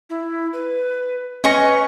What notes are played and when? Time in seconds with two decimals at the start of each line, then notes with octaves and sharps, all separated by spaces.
0.10 E4
0.53 B4
1.44 C#4 B4 D#5 G#5 C#6 A#6